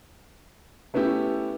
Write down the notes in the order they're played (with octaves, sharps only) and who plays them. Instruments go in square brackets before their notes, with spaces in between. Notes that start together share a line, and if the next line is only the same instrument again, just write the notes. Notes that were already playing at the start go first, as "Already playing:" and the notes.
[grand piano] A3 B3 C#4 E4 G4